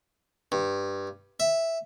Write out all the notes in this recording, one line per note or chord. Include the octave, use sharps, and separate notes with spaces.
G2
E5